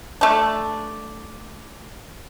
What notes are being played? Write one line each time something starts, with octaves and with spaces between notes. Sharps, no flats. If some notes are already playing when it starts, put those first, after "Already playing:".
A3 D4